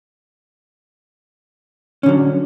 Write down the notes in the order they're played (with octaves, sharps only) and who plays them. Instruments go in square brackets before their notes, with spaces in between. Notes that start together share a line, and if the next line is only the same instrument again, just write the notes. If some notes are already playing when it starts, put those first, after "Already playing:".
[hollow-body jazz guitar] C#4
D3
F#3